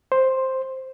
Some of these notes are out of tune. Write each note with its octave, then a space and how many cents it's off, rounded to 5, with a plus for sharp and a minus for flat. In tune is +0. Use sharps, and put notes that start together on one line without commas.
C5 +5